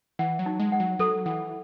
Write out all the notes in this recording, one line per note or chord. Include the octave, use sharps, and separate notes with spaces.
E3 F#5
F#3
D#4
G#3
F#5
F#3
F#3 A4
E3 F#5